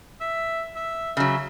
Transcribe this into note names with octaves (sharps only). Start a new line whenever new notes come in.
E5
E5
C#3 F#3 E5